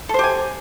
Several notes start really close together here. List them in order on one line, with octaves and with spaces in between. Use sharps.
A4 C5 G4 G#5